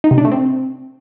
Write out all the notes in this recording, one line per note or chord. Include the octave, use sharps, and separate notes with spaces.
D#4
C3
D4
A3
C4